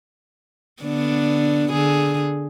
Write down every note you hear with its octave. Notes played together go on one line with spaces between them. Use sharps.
D3 B3 D4
D3 G#4